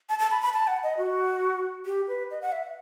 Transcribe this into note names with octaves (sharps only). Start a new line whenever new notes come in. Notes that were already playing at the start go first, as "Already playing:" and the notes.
A5
A5
B5
B5
A5
F#5
D#5
F#4
G4
B4
D#5
F#5
E5